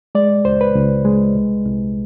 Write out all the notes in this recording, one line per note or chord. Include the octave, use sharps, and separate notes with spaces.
G#3 D5
C#2 C5
B4
C#2
G#3
C2
C2